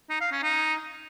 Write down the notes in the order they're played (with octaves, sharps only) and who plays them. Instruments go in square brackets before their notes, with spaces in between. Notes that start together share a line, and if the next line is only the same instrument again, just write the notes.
[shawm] D#4
F5
C#4
D#4